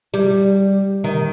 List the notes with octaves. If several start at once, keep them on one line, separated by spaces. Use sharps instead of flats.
G3
D#3